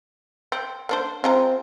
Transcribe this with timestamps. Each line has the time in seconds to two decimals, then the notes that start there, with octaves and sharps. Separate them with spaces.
0.52 C4
0.89 A#3 D4 C5
1.24 G#3 C4 F4 A#5